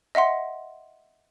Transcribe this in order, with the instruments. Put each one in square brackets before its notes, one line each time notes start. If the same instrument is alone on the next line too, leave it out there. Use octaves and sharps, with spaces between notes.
[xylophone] D#5 E5 F#5 C6